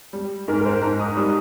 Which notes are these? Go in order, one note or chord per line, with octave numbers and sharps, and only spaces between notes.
G3
G#2 A#4
A#4
C5
G#2 A#5
D#6
G3 D#6